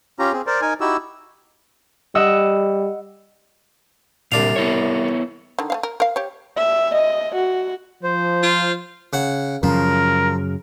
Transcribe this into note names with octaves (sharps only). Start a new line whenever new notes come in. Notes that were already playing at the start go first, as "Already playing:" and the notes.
C#4 F4 G4 A#5
C4 G#4
A#4 C5 D5
D#4 A#4 G#5
D#4 E4 F#4 G4 E6
G3 D#5 F#5 E6
C2 A#2 D3 D4 F5
B3 E4 C#5
D3 D#3
A3 C#4 F5
A#4
A#4 F5
G4 C#5
E5
D#5
F#4
F3 C5
F4
C#3 F#5
F#2 C#3 F3 A#4